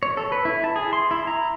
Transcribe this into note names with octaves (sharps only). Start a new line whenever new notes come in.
C#5
A4
B4
E4
A5
G#4
C6
E4
A#5